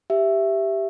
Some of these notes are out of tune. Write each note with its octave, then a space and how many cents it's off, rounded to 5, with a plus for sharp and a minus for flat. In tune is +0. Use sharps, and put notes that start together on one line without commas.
G4 +0 E5 +10